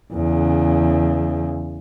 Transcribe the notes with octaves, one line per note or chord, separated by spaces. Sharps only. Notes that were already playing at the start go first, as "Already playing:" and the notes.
E2 C#3